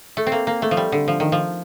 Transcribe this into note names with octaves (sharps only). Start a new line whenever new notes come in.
A3
C4
A#3
A#3
A3
F3
G3
D3
F3
D#3
F3